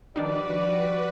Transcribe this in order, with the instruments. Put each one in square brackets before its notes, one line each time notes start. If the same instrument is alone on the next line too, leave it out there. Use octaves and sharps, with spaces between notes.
[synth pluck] D#3 D4 D#4 [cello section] F3 [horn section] G3 D5 [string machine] F#4 B4